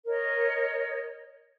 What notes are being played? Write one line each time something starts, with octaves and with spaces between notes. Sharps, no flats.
A#4 C#5 D#5